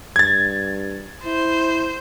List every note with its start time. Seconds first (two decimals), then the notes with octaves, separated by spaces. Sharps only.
0.16 G2 G#6 A6
1.24 E4 C5